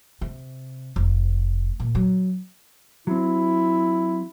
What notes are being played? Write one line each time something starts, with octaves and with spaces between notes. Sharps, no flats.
C3
F1
A#2
F#3
F#3 C4 E4